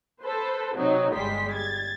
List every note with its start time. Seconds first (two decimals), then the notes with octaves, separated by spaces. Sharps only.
0.21 A4 B4 C5
0.75 C3 F#3 C4 D#4
1.13 G1 G3 G#3 C6 B6
1.54 G#6 A6